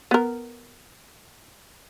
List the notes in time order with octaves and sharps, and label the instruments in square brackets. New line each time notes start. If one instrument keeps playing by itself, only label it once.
[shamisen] B3 A#4